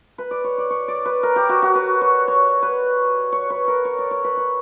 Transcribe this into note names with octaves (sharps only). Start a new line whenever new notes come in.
B4
D5
C#5
D5
C#5
D5
B4
A#4
G4
F#4
F#4
B4
C#5
C#5
B4
C#5
B4
A#4
C#5
D5
C#5
B4
B4